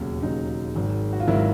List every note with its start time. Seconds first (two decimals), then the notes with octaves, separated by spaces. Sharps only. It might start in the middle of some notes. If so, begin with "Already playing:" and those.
Already playing: E1 D#2 C#3 F#3
0.23 E1 D#2 C#3 F#3 D#4
0.75 G#1 G#2 D#3 F#3
1.13 F#4
1.20 F4
1.27 G#1 G#2 D#3 F#3 E4